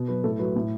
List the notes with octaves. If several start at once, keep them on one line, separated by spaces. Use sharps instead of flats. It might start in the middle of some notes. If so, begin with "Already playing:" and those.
Already playing: B2
F#3 B4
A2 A4
F#3 B4
A2